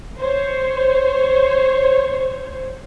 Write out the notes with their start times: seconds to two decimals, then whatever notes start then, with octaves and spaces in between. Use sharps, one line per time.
0.18 C5 C#5